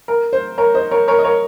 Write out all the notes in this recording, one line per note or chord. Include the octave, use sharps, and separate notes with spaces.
A#4
C5
A#4 C#5
C5 D#5
A#4 C#5
A#4 C#5
D#5
A#4 C#5